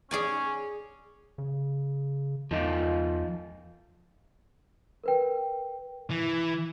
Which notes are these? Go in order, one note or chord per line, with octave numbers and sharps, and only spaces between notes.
C#4 G#4 D5 G#5
C#3
E2 F3 D#4 F4
A#4 B4 G5
E3